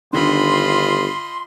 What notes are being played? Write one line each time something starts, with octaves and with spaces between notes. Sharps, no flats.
G1 D3 D#3 F4 D#5 B5 C6